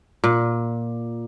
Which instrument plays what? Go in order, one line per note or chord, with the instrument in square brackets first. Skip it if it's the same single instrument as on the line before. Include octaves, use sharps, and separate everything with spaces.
[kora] A#2